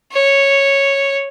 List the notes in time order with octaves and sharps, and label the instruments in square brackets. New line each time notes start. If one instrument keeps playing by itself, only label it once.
[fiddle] C#5